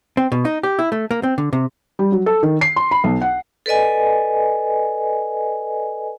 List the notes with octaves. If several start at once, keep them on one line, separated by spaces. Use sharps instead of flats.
C4
B2
D#4
G4
E4
A3
A#3
C4
D3
C3
G3
F#3
A4
D#3
C7
C6
B5
B1
F#5
A4 B4 D5 D#5 G#5